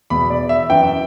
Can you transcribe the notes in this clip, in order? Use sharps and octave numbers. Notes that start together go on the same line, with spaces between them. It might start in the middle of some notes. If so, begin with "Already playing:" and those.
E2 B2 B5
D5
E5
F#2 E3 G5